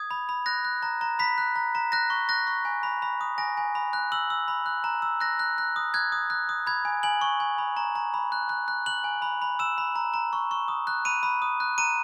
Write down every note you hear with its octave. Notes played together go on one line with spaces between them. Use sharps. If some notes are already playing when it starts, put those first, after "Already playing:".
Already playing: D#6 G#6
B5
B5
F#6 A#6
F#6
A#5
A#5
B5 B6
F#6
A#5
A#5
F#6 A#6
C#6
F#6 A#6
C#6
G#5
B5
B5
D#6
G#5 A#6
G#5
B5
F#6
E6 F#7
E6
B5
F#6
A#5
E6
F#6 A#6
F#6
F#6
D#6
F#6 G#6
D#6
F#6
D#6
B5 G#6
G#5
G#5 F#7
C#6
G#5
B5
A#5
A#5
B5
F#6
F#6
F#6
F#6 F#7
G#5
B5
B5
E6 E7
B5
A#5
A#5
C#6
C#6
D#6
F#6
B5 D#7
B5
D#6
F#6
A#5 D#7